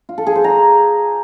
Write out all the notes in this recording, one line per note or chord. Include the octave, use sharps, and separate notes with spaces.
F4
A4
G#4
C5
A#5